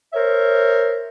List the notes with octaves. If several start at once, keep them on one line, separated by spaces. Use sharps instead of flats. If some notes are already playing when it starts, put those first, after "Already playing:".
A#4 C5 C#5 E5